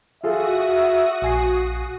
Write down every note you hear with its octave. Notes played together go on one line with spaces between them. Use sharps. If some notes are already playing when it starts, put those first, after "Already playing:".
F4 F#4 G#4 A4 E5 D#6
A#1 G#5 C7